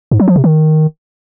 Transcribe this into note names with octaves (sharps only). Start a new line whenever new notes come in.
G#2
F#3
F3
C3
D#3